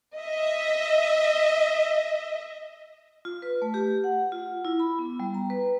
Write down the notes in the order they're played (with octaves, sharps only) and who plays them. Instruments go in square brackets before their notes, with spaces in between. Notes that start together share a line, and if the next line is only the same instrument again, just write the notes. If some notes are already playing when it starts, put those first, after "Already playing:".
[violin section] D#5 E5
[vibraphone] F4
B4
A3
G4
F#5
F4
E4
B5
B3
G3
A#5
B4